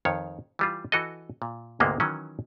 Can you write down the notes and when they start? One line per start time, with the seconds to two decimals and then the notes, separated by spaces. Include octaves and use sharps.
0.05 F2 D#3 C#5
0.59 E3 G3 F4
0.92 E3 F#4 A4 D#5
1.42 A#2
1.80 D2 G#2 C3 G#3 A#3 B3
2.00 D#3 E3 F#3 C#4